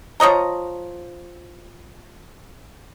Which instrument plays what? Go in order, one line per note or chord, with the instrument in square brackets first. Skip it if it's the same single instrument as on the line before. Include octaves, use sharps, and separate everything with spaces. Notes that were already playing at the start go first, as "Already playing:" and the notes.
[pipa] F3 C#5 D#5 A#5